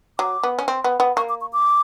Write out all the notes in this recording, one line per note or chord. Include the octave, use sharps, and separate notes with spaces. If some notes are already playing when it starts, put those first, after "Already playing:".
F#3 D6
B3
C#4
C4
B3
B3
A#3 C#6
D6
C#6
D6